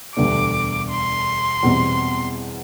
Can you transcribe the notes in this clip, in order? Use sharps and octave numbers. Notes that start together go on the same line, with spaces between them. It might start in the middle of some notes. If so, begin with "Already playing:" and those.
E1 D2 D3 G3 D4 D6
C6
E2 B2 G3 C4